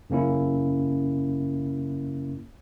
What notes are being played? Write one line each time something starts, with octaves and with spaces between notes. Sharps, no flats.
F#2 C#3 A#3 C#4 E4